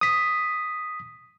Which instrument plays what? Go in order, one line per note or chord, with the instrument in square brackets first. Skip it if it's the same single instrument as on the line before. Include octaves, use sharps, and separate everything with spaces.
[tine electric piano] D#6 B6